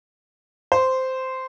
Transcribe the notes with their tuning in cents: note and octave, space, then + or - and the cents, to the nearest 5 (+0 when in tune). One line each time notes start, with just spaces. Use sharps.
C5 -10